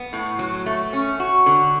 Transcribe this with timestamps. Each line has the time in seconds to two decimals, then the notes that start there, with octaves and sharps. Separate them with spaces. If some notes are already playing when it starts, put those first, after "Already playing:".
Already playing: B3
0.13 A2
0.39 F#3
0.66 A3
0.93 C#4
1.20 F#4
1.46 D3